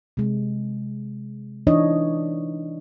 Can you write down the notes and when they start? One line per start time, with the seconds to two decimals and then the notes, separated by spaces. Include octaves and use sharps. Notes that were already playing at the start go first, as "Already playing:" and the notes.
0.17 C3 G#3
1.67 E3 D4 D#4 C#5 D#5